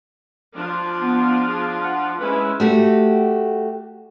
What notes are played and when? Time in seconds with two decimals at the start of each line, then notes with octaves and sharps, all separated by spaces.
0.56 F3 D4 F4
1.02 B3
1.47 G#4
1.84 F#5
2.20 G#3 C#4 E4 B4
2.60 A3 F#4 G4